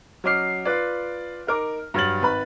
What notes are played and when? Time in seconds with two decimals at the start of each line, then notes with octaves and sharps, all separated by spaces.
0.24 F#3 C#4 D#5 D6 F6 C7
0.65 F4 B4 D5
1.47 D#4 A#4 D6
1.94 G2 F#3 F6 A6 F#7
2.22 G#1 B4 B5